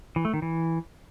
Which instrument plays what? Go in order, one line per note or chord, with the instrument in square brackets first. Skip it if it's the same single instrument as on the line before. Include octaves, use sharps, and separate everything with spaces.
[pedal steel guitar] E3
A3
D#3
E3